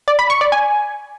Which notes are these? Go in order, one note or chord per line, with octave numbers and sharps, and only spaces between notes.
D5
B5
C#6
D5
G#5